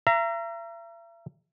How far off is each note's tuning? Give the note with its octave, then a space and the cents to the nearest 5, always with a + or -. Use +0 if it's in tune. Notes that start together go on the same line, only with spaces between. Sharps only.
E5 +45 A#5 +0